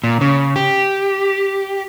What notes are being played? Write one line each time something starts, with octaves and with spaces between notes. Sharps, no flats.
A#2
C#3
G4